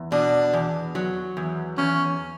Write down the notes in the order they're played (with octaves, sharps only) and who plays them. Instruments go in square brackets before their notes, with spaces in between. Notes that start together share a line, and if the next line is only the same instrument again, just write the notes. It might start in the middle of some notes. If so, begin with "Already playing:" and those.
Already playing: [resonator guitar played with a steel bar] E2
[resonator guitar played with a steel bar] B2 [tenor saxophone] D4
[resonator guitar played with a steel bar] E2
F#3
E2
[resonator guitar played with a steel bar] E2 [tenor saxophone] C#4